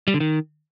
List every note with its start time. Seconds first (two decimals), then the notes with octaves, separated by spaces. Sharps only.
0.08 G3
0.14 D3
0.20 D#3